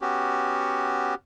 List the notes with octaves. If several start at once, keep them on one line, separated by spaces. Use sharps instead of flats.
B3 C#4 F#4 G4